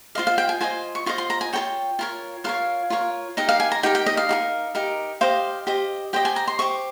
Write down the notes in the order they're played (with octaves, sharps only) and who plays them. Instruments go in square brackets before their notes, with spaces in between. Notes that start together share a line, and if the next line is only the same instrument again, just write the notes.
[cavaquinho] F4 C5 D#5 F5
F5
G5
G#5
F4 C5 D#5 G#5
C#6
F4 C5 D#5 C#6
C6
A#5
G#5
F4 A#4 C#5 G5
F4 A#4 C#5
F4 A#4 C#5 F5
F4 A#4 C#5
D#4 G4 A#4 D#5
F5
G#5
A#5
D#4 G4 A#4 G5
G5
D#5
F5
D#4 G4 A#4
D#4 G4 A#4
G4 C5 D#5 F5
G4 C5 D#5
G4 C5 D#5 G5
G#5
A#5
C6
G4 C5 D#5 C#6